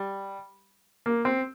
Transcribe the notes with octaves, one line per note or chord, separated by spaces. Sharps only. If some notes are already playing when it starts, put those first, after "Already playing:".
Already playing: G3
A#3
C4